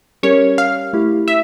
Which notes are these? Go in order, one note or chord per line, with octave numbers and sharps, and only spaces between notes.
G3 C#4 G4 A#4 C#5
F5
A3 E4 G4
E5